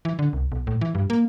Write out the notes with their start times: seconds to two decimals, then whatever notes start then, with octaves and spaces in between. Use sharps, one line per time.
0.05 E3
0.19 D3
0.33 C2
0.52 B1
0.67 A2
0.81 E3
0.95 G2
1.10 A#3